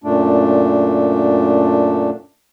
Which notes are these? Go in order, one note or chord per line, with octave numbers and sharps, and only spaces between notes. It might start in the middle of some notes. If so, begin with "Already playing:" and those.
F#2 A#2 A3 D4